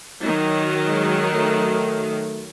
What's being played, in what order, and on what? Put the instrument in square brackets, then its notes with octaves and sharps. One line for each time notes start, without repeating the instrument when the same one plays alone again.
[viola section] D#3 F#3 [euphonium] D#4
[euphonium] G#3
A3